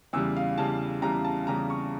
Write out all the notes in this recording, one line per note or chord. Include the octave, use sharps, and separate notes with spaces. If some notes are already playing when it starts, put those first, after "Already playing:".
E2 C#3 G3 E6
F5
E2 C#3 G3 A5
E2 C#3 G3 A#5
A5
E2 C#3 G3 A#5
C#6